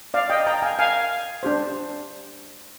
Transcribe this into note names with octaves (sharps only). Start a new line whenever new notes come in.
D5 F5
D#5 G5
G5 A#5
F5 G#5
F5 G#5
D4 G4 C5